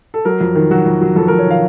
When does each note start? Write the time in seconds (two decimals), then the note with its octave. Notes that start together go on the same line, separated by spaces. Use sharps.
0.14 A4
0.25 F#3 A#4
0.41 F2
0.55 D#3
0.71 F#3 F#4
0.86 F2
1.01 F#3
1.16 F2 A4
1.28 F2 A#4
1.39 C#5
1.46 D#3 F5